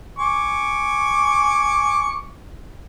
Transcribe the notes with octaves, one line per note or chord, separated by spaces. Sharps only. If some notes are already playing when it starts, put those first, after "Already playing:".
G#5 C#6 D6